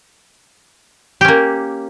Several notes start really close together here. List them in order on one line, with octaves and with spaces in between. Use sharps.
G4 C#4 A#3